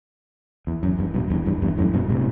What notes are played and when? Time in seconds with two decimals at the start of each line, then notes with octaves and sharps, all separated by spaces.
0.67 E2
0.83 F#2
0.99 E2 G2
1.14 G2 B2
1.30 E2 G2
1.46 E2 G2
1.62 E2 G2
1.78 F#2 A2
1.94 G2 B2
2.10 A2 C3